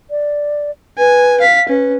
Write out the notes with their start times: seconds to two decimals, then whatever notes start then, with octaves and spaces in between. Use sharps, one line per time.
0.10 D5
0.99 B4 G#5
1.41 F5 B6
1.69 C#4 B4